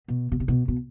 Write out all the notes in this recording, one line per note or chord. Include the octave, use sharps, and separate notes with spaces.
B2
B2
C3
B2
B2